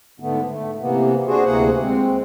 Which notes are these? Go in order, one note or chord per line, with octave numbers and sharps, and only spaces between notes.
G#2 D3 A3 B3
A3
C3 E3 A#3 B3
D4 F#4 G#4 C5
D2 C3 E3 A#3 G#4 F#5
G#3 C4